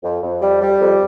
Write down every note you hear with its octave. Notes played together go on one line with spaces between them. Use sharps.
F2
F2
G3
G3
F2